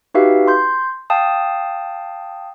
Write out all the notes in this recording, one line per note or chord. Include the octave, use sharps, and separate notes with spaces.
D#4 F#4 G4 B4 E5 F5
C6 G6
F5 G5 A5 D#6